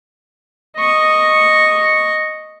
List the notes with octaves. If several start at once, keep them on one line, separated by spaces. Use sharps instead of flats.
D#5 C#6